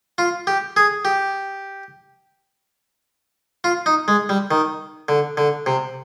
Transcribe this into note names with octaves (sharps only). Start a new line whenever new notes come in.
F4
G4
G#4
G4
F4
D#4
G#3
G3
D#3
D3
D3
C3